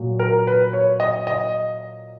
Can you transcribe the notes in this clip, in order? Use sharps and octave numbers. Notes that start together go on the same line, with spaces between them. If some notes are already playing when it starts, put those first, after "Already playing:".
Already playing: A#2 F#3
A#4
B4
C#5
D#5
D#5